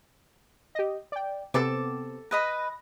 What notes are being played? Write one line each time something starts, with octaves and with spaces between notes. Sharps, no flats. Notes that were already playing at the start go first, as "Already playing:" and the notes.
G4 D#5
D5 G5
C3 B3 C4 A4 A5 D6
B4 D#5 B5 A#6